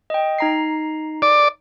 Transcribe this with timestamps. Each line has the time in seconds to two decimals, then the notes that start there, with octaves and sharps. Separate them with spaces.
0.10 D#5 G5
0.39 D#4 A#5 C7
1.22 D5